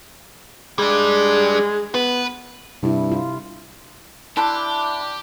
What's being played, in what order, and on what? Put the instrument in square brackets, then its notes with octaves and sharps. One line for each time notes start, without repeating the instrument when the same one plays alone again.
[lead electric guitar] G3 D4 [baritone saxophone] G#3
[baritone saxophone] B3 [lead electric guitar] B4
[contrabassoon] G2 [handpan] C3 E4
[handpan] F4
[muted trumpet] D4 [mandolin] E4 C6 F#6 [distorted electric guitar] G4 [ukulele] A5